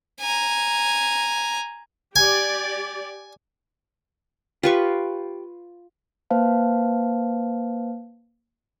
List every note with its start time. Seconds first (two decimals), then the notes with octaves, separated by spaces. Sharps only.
0.21 G#5 A#5
2.16 G4 D5 G#5
4.63 F4 G4 B4 C#6
6.30 A#3 B4 C5 F5 A5